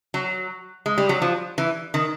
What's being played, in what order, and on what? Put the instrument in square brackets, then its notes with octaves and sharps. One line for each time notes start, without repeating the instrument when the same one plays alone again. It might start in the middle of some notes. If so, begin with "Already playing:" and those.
[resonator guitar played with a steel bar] F#3
G#3
G3
F#3
F3
E3
D#3